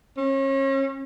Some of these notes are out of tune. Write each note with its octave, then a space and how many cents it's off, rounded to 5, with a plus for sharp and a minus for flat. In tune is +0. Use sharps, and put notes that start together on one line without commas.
C#4 -35